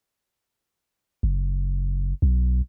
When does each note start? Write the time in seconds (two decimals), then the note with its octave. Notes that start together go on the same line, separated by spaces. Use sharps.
1.23 F#1
2.22 B1